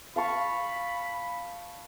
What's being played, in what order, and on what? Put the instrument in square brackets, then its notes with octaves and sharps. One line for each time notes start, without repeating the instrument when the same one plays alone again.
[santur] F5 A5 C#6 [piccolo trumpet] B5